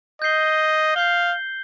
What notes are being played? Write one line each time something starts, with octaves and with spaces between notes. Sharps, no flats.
D#5 G6 C7 G7
F5 G6 C7 G7